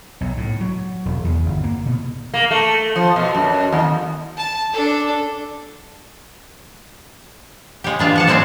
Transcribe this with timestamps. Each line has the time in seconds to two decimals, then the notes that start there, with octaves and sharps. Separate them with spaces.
0.21 B1
0.37 A2
0.61 F#3
1.05 E1
1.24 E2
1.46 G1
1.64 A#3
1.86 B2
2.34 A#3
2.51 A3
2.96 F3
3.16 B2
3.35 F#2
3.72 D#2
4.37 A5
4.73 D4 A4
7.84 G#3 G4
7.99 E3 D4 F4
8.16 F3 F#5 A5
8.27 F#3 G#3 C4 C#4 C5